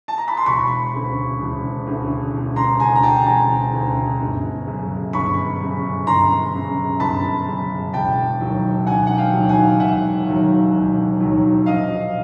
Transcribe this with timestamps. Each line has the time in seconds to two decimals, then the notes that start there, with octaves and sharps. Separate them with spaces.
0.08 A5
0.18 A#5
0.28 B5
0.37 C6
0.46 E1 B5 C#6
0.94 D2 C#3
1.40 E1
1.87 D2 C#3
2.34 E1
2.56 A#5 C6
2.80 D2 C#3 G#5 A#5
2.96 A#5
3.03 G5 A5
3.26 E1 G#5 A#5
3.73 D2 C#3
4.20 G1
4.67 F#2 C#3
5.13 G1 B5 C#6
5.60 F#2 C#3
6.07 G1 A#5 C6
6.53 F#2 C#3
7.00 G1 A5 B5
7.47 F#2 C#3
7.93 E1 G5 A5
8.40 D#2 D#3 F#3
8.86 E1 F#5 G#5
9.07 F#5
9.18 F5 G5
9.33 D#2 D#3 F#3
9.49 F#5 G#5
9.80 E1 E5 F#5
10.26 D#2 D#3 F#3
10.73 E1
11.20 D#2 D#3 F#3
11.66 A#1 D#5 F5